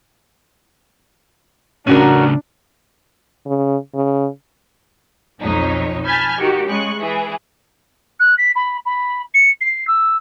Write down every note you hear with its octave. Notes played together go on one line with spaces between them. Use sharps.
A2 C#3 C#4 D4 F#4 A#4
C#3
C#3
B1 F2 D#4 C#5
G#5 A5 B5 F6 G6 G#6
D#3 F#4 G4
C#3 G#3 C#6 F#6
E3 G#4
F#6
B6
B5
B5
C#7
C7
E6